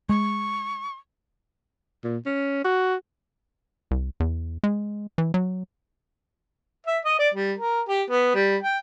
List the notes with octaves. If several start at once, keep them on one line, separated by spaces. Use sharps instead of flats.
G#3 C#6
A#2
C#4
F#4
C2
E2
G#3
E3
F#3
E5
D#5
D5
G3
A#4
G4
B3
G3
G5